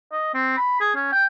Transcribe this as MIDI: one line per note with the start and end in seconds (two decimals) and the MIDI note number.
0.12 0.30 75
0.34 0.56 60
0.57 0.75 83
0.80 0.91 68
0.95 1.11 61
1.12 1.25 79